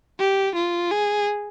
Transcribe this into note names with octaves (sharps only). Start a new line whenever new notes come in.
G4
F4
G#4